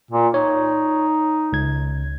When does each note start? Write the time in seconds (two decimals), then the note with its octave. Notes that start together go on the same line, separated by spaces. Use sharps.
0.11 A#2
0.34 D#4 C#5
1.53 C#2 G#6